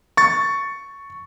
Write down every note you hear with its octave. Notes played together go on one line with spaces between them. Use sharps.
C#6 A6